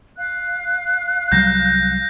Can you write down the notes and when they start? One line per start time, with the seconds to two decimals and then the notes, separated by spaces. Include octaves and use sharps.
0.17 F5 F#6
1.32 C2 F#3 G3 G6 A#6